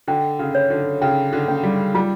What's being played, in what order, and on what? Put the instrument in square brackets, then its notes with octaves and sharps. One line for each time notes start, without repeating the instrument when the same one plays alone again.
[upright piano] D3 [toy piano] G5
[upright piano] C#3
[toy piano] C#5
[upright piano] D3
[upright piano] C#3 [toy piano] G5
[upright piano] D3
[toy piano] C#4
[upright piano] G3
[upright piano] G3 [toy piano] F4